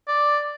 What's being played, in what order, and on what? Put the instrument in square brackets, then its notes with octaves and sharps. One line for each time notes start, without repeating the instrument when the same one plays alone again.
[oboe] D5